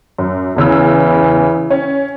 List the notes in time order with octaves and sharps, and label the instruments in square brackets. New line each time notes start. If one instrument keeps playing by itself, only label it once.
[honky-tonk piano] F#2
[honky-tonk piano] E2 C#3 E6 [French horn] E3
[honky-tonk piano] C#4